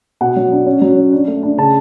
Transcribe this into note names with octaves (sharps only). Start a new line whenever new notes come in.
B2 F#5
F#3
D4
C#4
F#3
C#4
D4
A3
D4
C#3 A5